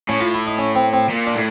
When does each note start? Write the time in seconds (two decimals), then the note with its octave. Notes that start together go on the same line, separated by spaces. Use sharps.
0.09 A2 C#4
0.21 F4
0.34 E4
0.47 D#4
0.58 C#4
0.75 C4
0.93 C4
1.09 A#2
1.27 D4
1.35 A2